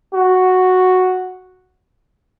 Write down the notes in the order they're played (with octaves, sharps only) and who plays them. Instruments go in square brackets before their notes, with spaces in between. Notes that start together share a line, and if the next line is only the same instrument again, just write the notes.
[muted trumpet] F#4